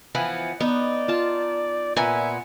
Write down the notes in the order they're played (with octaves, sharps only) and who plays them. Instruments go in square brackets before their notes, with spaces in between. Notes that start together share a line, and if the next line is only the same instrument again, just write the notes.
[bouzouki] E3 F3 B3 [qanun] B5
[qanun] B3 [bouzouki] D#4 [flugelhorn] D5
[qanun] F4 A5
[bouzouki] A#2 B3 [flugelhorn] E5 [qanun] G#5